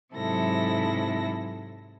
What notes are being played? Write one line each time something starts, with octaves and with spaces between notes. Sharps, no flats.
G#2 C3 F#3 E4 A4 A#6